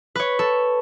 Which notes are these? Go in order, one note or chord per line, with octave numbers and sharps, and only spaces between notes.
B4 C#5
A4